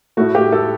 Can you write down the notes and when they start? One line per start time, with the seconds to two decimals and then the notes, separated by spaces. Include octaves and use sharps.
0.17 A2 A3 F#4
0.35 G4
0.52 A4